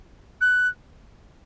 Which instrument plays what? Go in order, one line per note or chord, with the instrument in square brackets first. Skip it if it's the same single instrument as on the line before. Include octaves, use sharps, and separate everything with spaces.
[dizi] F#6